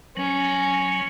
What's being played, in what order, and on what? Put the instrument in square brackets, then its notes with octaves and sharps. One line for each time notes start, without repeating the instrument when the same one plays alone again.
[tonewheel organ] F#3 [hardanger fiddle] C#4